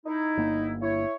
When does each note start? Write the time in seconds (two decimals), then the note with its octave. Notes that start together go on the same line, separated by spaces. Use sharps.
0.06 D#4 E4
0.37 G1 A#3
0.81 E4 C#5